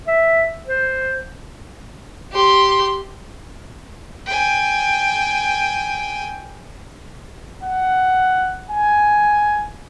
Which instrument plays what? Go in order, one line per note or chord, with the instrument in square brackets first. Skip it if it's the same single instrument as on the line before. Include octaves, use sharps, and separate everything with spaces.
[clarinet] E5
C5
[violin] G4 C6
[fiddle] G5 G#5
[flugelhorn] F#5
G#5